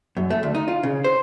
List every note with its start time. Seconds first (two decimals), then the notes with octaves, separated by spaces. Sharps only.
0.17 F#2
0.30 A3
0.43 D2
0.55 D#4
0.68 F4
0.83 C#3
1.04 C5